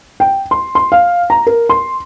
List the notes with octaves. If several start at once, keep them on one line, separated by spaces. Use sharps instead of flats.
G5
C6
C6
F5
A#5
A#4
C6